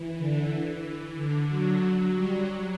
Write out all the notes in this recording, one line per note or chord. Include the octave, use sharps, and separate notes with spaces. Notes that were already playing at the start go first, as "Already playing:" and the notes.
Already playing: E3
D3
E3
D3
F#3
F#3
G3
F#3